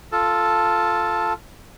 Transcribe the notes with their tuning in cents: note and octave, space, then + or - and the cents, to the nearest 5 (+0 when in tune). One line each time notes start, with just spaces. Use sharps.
F4 +0 A4 +0 A5 +0